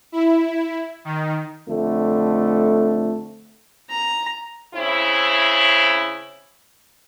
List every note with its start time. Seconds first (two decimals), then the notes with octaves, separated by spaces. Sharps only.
0.12 E4
1.05 D#3
1.67 F2 D3 A3
3.90 A#5
4.74 C#3 C4 E4